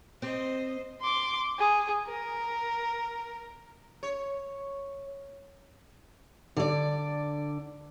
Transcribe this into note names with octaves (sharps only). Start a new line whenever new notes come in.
C4 G4 C5 D#5
C6 D6
G#4
A#4
C#5
D3 D5